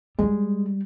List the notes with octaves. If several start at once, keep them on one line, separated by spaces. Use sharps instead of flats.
G3 G#3